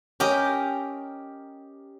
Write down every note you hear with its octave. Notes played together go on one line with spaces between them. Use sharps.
C#4 G4 A#4 D#5